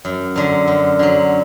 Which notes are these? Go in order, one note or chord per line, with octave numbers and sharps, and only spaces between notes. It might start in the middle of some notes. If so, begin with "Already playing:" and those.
F#2
D3 F#3
F#2
D3 F#3